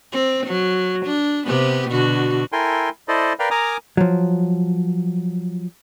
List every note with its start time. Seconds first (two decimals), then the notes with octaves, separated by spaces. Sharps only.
0.12 C4
0.46 F#3
1.06 D4
1.46 C3 B3 G4
1.89 B2 D3 F#4
2.52 E4 A4 A#4 G5 G#5 C6
3.08 E4 A4 C5 D5 D#5
3.39 A#4 B4 D5 F5 G5
3.51 A#4 G#5 A#5 D6 D#6 F6
3.97 F3 F#3